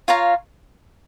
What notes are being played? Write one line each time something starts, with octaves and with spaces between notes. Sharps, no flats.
F4 C#5 F5 A#5